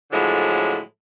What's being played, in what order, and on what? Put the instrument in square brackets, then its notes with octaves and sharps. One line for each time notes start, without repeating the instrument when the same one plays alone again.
[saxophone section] A2 D3 F3 F#3 G#3